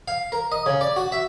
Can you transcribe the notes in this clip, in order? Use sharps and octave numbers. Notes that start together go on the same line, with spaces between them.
F5
A#4
D#5
C#3
D5
F#4
E5